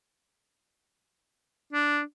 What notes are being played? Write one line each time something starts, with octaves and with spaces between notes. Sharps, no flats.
D4